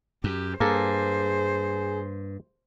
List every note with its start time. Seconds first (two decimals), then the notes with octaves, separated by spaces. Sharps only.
0.24 F#2 G4
0.60 G2 A#3 G#4 A4 C5